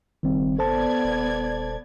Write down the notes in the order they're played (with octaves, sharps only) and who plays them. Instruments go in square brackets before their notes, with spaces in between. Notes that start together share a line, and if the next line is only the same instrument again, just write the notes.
[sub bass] F#1 [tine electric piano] D#3 G3 C4
[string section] B3 D5 G#6 [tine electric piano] A4 C5 A5
[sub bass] D#1